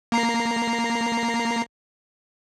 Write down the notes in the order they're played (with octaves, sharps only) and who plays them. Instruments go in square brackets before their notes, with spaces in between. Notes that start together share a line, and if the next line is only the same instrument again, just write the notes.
[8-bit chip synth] A#3 A#5 C7